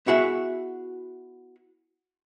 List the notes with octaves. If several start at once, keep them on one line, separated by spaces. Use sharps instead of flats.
B3 E4 F#4 G#4 E5 F#5